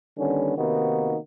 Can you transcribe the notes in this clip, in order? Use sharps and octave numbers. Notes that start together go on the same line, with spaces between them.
D3 D#3 G3 B3 C#4
C3 D#3 A#3 B3 D#4 F#4